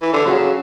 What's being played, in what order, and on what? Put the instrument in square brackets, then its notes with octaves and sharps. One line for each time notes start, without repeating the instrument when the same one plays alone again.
[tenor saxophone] E3
D3
[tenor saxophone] C#3 [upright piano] F#3 C#4 F#4